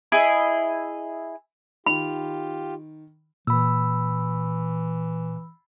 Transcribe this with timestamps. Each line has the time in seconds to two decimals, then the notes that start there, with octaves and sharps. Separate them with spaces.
0.12 E4 G#4 D#5
1.86 D#3 F4 G4 B5
3.47 A#2 E3 B5 E6